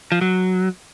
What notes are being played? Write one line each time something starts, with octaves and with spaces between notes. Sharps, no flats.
F3
F#3